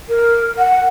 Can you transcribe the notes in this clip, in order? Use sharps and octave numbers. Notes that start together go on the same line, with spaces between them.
A#4
F#5